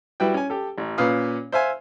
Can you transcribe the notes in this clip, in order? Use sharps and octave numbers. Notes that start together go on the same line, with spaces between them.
G3 E4 F#4 B4 G5
C#4 G#5
G4 A4
A1
A#2 C#4 B4 F5 D#6
C5 E5 F5 G#5